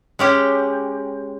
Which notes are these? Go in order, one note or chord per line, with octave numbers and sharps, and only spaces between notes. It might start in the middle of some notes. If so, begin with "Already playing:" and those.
G#3 C#4 G4